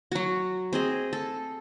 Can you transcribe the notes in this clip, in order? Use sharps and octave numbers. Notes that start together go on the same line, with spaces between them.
F#3 F#4
C4 G#4 D#5
A4